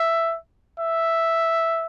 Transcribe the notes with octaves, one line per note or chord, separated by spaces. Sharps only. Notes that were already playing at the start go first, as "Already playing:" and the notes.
Already playing: E5
E5